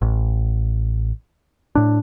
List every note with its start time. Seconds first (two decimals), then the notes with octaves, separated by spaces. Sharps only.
0.02 A1
1.75 A2 D4